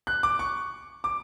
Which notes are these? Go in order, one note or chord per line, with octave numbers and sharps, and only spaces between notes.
F#6
D6
C#6
D6